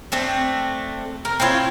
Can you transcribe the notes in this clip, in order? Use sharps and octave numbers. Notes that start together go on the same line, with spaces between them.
A3 C4 D4
A#4
C4 E4 F4 C#5